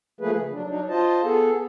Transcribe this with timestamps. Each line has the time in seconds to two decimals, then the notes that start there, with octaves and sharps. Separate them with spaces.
0.21 F3 A3 A#3 G#4 B4
0.37 C#3
0.52 F#3 D4
0.67 F#3 D4 D#4
0.89 F4 C5 D#5 A5
1.24 B3 G#4 A4